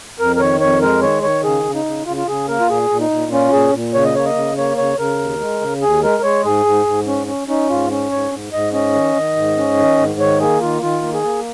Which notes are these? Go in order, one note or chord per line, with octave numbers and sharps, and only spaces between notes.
F2 A#4
A#4
D#3 C#5
F2 C#5
G#3 A#4
D#3 C#5
D#3 C#5
C#3 G#4
C#3
D#4
C#3
C#3 F4
F4
C#3 G#4
A#3 A#4
F4
A#2 G#4
A#2
D#4
A#2
C#4 F4
A#2 G#4
A#2
C#3 C#5
D#5
A#3 C#5
D#5
C#3
A#3 C#5
C#3 C#5
C#3 A#4
D#2
G#3
C#3
D#2 G#4
G#3 A#4
G#3 C#5
G#2 G#4
G#2
G#2
C#4
C#4
C#4 D#4
G#2 F4
C#4
G#2 C#5
G#2
G#2 D#5
C#4 D#5
D#3
D#3
G#2
C#4
D#3
G#2
D#3 C#5
A#3 G#4
D#3 F4
D#3 F4
A#3
G#4
A#3